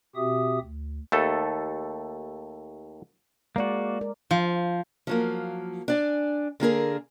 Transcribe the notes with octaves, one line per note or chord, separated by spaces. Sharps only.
B2 C4 F#4 G4 E5 D#6
D2
D#2 A3 A4
G#3 A#3 F#4 D5
A#4
F3
F3 F#3 A#3
D4 D5 G#5
D3 A#3 G#4 A#4